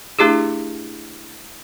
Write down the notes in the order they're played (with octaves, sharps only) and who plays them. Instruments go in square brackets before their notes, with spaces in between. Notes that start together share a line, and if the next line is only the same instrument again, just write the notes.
[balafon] A3 D4 E4 G4 G#4